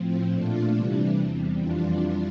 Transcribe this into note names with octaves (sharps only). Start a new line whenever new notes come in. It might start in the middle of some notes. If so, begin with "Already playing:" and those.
Already playing: A2 F3 C4
A#2 A3 D4 F4
C3 E3 G3 D4
E2 C3 G3
F2 E3 G3 D4 F4